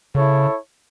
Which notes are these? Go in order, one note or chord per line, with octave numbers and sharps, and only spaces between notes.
C#3 E4 A4 C#5